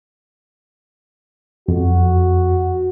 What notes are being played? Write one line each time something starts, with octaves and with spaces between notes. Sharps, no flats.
F2 F#4